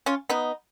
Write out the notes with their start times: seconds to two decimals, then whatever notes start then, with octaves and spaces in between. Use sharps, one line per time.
0.06 C#4 F4
0.29 B3 D#4